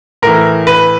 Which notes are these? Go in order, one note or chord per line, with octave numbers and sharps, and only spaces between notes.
A2 E3 A#4
B4